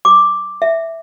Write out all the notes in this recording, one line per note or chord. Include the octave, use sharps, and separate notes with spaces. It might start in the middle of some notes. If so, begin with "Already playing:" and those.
D6
E5